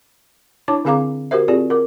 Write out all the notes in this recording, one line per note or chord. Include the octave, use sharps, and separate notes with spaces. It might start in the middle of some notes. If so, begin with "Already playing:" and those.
D4 E4 C#5 A5 D6
D3 C4 G#4 F5 A#5 D6
F#4 G4 A#4 C5 E5
C4 F4 G4 G#4 D5
A#4 D6